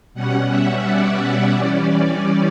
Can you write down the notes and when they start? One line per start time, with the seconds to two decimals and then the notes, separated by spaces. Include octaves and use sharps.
0.14 B2 G3 C#4 F#5
0.49 E5
0.84 D5
1.53 E3 G3 C#4